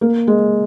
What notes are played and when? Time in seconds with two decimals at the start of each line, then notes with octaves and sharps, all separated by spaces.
0.01 A#3
0.27 G#3